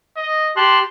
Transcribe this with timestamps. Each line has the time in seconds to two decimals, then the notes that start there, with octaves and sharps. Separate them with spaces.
0.17 D#5
0.57 G4 A5 C6 F#6